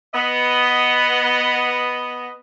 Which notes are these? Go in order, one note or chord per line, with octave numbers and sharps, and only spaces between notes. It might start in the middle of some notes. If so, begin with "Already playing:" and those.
B3 D#5